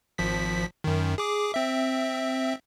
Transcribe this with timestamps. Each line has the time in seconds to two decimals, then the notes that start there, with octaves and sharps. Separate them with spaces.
0.18 G#1 F3 B6
0.84 F#2 D#3
1.18 G#4 D6
1.54 C4 E5